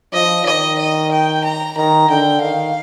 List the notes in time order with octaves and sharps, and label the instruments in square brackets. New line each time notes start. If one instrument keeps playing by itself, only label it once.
[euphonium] F3 [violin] D#5
[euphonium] D#3 [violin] D#5
[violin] D#5
G5
A#5
[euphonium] D#3 [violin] A#5
[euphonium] D3 [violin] G5
[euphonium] D#3 [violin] F5